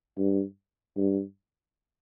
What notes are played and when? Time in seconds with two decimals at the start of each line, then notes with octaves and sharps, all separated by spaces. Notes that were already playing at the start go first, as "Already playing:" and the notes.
0.18 G2
0.97 G2